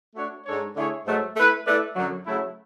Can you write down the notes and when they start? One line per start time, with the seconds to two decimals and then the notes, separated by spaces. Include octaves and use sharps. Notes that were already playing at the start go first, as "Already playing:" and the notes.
0.15 A3 D4 F#4 C#5
0.46 G#2 G#3 D4 A4 C#5
0.75 D3 A3 E4 G#4 C#5
1.06 G#2 F#3 A3
1.36 A3 E4 B4
1.66 A3 E4 B4 D5
1.96 F#2 D3 F#3
2.26 C#3 F#3 A3 E4